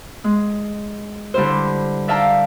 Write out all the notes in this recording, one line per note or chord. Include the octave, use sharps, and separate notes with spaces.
G#3
D3 G3 E4 C5
D5 E5 F5 G5 A5 A#5